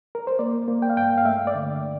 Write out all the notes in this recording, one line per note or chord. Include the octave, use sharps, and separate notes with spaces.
A#4
C5
A#3 D5
A#3
G5
F5
G2 G5
F5
A3 E5
D5
D3